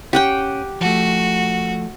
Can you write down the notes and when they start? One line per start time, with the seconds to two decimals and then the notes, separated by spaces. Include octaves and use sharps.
0.13 C#4 G4 F#5 G5
0.81 F3 A3 F#4